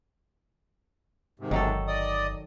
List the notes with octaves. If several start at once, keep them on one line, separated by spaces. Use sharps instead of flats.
D#2 G#2 C3
G1 D#3 F#3 A4
D5 D#5 D#6